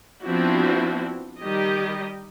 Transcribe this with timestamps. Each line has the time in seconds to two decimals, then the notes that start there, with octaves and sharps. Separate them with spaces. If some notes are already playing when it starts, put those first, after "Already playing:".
0.23 F3 B3 C4 D4 E4 F#4
1.41 D#3 G3 G4 D#5